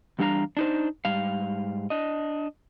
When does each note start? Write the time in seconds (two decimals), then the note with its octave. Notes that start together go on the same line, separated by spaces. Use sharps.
0.19 E2 G3 D4 F4 F5 A#5
0.57 D4 D#4 C5
1.05 G#2 G3 F5
1.90 D4 D#5